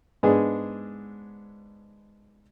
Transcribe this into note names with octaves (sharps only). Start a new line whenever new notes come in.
G#2 G#3 B3 D4 G#4